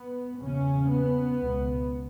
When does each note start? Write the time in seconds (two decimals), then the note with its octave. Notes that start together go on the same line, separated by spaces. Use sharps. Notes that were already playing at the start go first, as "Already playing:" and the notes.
Already playing: B3
0.41 E2 C#3 C#4
0.90 B3
1.39 C#2 B2